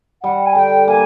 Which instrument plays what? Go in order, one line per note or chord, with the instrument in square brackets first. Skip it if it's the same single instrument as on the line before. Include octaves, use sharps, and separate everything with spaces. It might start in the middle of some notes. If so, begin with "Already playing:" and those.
[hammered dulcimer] G3 [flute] F#5
[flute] G#5
[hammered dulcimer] D3 [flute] G5
[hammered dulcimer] A#3 [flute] G#5